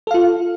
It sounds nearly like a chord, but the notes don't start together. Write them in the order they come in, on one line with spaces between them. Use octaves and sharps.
A4 F5 F4